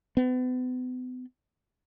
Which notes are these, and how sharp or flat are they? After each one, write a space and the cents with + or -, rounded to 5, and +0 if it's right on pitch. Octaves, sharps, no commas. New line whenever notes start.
B3 +40